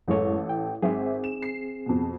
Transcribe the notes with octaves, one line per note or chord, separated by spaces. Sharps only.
A1 F#2 G#3 A4 C#5
G5
G#1 C4 G#4 E5
E7
C7
F2 B2